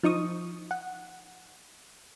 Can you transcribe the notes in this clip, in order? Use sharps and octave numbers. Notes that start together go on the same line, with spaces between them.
F3 D#4 C#6 D#6
F#5